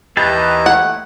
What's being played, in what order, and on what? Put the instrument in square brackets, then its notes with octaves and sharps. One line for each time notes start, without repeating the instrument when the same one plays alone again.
[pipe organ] D#2 E3 [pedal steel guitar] E4 G4 A5 [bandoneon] B4 D#5 A#5
[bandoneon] A3 [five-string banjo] F#5